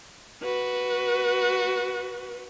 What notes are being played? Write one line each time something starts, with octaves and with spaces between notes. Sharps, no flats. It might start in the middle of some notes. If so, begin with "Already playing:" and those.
F#4 B4